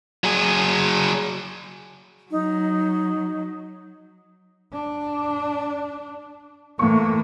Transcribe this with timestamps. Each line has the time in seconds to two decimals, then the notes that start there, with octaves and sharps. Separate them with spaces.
0.24 F#3 G#4
2.31 F#3 D#4
4.73 D4
6.79 A2 E3 A#3 C#6